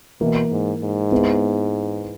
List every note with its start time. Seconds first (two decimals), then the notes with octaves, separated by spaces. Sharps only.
0.21 B2 E3 A#3 E4
0.51 G#2
0.81 G#2
1.11 G#3 B3 E4